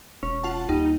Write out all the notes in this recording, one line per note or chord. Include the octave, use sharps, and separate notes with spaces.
E1 C#4
F4 F#5 A5
D#2 G3 D#4